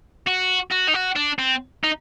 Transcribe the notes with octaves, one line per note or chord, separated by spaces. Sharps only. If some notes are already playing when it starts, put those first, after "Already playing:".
F#4
F#4
D#4
F#4
D4
C4
D#4